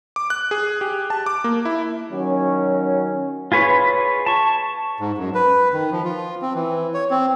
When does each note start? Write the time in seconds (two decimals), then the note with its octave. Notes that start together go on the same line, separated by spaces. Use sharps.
0.16 D6
0.30 F#6
0.51 G#4
0.81 G4
1.10 A5
1.26 D6
1.44 A#3
1.65 E4
2.10 D#3 F#3 C#4
3.52 F4 G#4 B4 C#5
4.26 A5 C#6
5.00 G#2
5.18 F#2
5.35 B4
5.73 D#3
5.91 F3
6.05 F4
6.42 C4
6.55 E3
6.94 C#5
7.11 C4